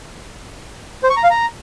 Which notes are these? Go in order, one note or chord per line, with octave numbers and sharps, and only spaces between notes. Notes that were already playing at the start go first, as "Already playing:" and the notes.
C5
C#6
A#5
F5
A#5